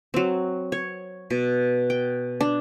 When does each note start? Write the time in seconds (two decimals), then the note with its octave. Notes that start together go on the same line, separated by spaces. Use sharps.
0.14 F#3 C4
0.72 C#5
1.30 B2
1.90 G5
2.41 D4